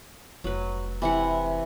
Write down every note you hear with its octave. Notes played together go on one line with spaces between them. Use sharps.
F1 F#3 B4
C3 E3 E4 F#5